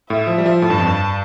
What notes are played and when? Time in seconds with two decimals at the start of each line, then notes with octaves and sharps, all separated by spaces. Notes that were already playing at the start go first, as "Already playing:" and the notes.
0.10 A2 E5
0.27 F3
0.38 G3
0.46 F3
0.62 A2 A5
0.70 G2
0.78 F2
0.86 G2